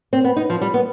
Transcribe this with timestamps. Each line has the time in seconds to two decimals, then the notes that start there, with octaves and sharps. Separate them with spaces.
0.13 C4
0.24 B3
0.36 D#4
0.50 F3
0.61 G3
0.74 B3